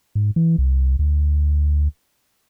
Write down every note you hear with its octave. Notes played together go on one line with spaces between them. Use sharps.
G#2
E3
C2
D2